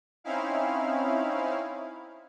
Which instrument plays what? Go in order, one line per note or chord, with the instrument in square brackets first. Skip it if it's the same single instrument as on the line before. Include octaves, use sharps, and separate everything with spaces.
[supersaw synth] C4 C#4 D#4 E4 F5